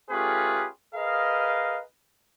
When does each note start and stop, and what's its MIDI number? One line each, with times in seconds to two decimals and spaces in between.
0.10 0.66 57
0.10 0.66 61
0.10 0.66 65
0.10 0.66 67
0.10 0.66 68
0.10 0.66 71
0.95 1.81 68
0.95 1.81 70
0.95 1.81 71
0.95 1.81 75
0.95 1.81 77